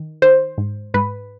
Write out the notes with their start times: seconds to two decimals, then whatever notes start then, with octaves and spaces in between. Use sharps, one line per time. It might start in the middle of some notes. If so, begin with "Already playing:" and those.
Already playing: D#3
0.22 D#3 C5
0.58 G#2
0.94 G#2 B4